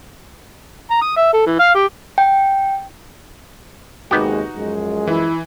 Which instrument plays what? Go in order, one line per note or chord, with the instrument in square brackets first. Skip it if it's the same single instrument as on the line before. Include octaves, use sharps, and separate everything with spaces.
[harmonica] A#5
D#6
E5
A4
E3
F5
G4
[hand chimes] G5
[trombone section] D#2 C3 G#3 [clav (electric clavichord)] B3 G4 [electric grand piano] D#4 F#4
[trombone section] F#2 F3 G#3
[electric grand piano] E3 [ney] E4